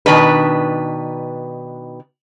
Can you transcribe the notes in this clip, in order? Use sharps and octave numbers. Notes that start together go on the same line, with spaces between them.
B2 D#3 D4 B4